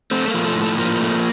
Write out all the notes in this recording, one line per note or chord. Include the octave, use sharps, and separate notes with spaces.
A3 C4
A#3
F3
A3
A2
A3
F3 A#3
A3